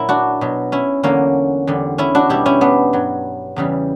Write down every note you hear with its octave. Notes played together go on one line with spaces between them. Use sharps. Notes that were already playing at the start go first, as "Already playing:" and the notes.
Already playing: A#2 F#3 E4 A#4
D4 F#4
B2 F#3
C#4 E4
E2 D3 F#3 A#3 C#4
E2 D3 G3
C#4 E4
D4 F#4
B2 G3 E4 G4
C#4 E4
B3 D4
G2 F#3
E2 C#3 E3 G3